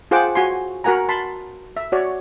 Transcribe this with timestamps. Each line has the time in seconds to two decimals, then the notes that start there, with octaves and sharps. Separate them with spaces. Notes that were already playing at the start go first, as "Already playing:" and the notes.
0.11 F4 G#4 C5 F#5 G5 D6
0.35 F#4 G#5 C6
0.84 F#4 A#4 F#5 G#5 A#5
1.09 A5 B5 C6
1.77 E5
1.92 F#4 C#5 D5